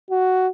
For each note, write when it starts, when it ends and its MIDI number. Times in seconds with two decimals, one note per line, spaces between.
0.10 0.48 66